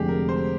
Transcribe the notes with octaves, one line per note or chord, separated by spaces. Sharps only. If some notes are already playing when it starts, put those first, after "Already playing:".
Already playing: F1 F2 D3 G#3 G4 G#4
A#4
C5